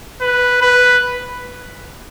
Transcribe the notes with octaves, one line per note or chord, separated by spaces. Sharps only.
B4
B4